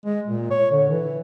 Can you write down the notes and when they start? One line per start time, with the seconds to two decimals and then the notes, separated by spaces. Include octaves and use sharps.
0.05 G#3
0.27 A#2
0.51 C#5
0.72 D3
0.90 E3